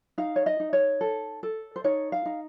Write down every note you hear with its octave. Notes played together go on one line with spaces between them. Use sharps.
D#4 F5
C#5
D#5
D#4
C#5
A4
A4
C5
D#4 C#5
F5
D#4